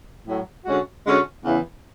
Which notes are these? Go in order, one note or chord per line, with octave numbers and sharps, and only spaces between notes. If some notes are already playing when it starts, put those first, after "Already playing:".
A2 F#3 A3
D3 G#3 C#4 F#4
D3 G#3 C#4 F#4
E2 C#3 E3